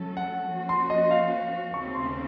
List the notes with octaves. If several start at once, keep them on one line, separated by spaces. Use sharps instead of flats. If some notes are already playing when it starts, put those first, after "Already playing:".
Already playing: F#3 A3 C#4 A4
F#5
F3 A#3 C#4 F#4 C5
C6
D#5
F5
D#2 C#3 A3 C4 C#6
C6